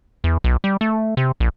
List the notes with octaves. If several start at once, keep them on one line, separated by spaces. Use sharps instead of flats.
E2
B1
G3
A3
C3
A#1